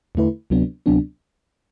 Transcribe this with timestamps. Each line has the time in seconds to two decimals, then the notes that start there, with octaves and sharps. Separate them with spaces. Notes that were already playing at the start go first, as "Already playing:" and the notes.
0.15 E2 D3 A3 E4 B4
0.50 D2 C3 F#3 B3 D4
0.86 D2 C3 F#3 B3 D4